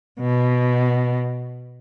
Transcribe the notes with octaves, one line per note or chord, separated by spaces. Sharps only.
B2